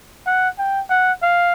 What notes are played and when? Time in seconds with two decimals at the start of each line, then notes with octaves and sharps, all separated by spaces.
0.26 F#5
0.58 G5
0.90 F#5
1.22 F5